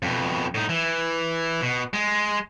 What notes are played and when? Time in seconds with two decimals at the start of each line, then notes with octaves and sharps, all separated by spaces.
0.03 F2 B2
0.55 A2 D#4
0.69 E3
1.61 B2
1.93 G#3